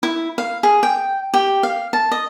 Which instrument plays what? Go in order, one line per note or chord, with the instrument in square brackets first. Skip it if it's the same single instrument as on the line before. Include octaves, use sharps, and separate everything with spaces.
[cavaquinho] E4
F5
G#4
G5
G4
F5
A5
D#5